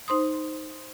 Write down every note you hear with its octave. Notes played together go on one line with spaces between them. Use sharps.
D#4 C5 C6 D#6